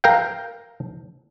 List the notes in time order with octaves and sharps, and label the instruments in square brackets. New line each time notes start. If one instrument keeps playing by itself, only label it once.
[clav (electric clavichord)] A#4 F5 G5